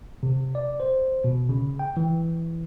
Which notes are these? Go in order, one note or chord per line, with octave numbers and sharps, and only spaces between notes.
C3
D5
C5
B2
C#3
G5
E3